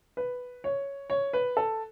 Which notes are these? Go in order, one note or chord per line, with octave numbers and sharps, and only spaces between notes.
B4
C#5
C#5
B4
A4